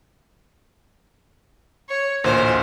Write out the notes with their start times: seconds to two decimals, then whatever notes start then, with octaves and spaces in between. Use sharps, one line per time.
1.89 C#5
2.24 A1 D2 A#2 C5